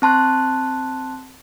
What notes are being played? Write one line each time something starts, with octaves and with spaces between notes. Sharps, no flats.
C4 A5 C6 F#6